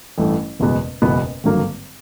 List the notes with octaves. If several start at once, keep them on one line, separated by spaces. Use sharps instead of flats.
A1 G2 E3 A3
F#1 E2 B2 G#3 B3
F#1 E2 B2 G#3 B3
G#1 G2 D3 F#3 A#3